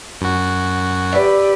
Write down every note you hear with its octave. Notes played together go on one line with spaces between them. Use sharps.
F#2 F#4
G4 B4 D5 E5